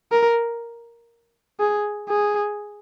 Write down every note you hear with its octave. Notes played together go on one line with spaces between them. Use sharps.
A#4
G#4
G#4